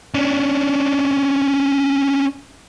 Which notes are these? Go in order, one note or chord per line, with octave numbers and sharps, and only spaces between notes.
C#4 D4